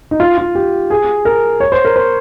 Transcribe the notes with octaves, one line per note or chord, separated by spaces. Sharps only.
D#4
F4
F4
G4
G#4
A#4
C#5
C5
A#4
C5